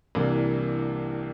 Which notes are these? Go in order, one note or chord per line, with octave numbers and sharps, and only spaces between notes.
C2 C3 E3 A#3 D4